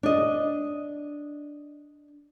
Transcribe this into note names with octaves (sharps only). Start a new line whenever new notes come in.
D4 D#5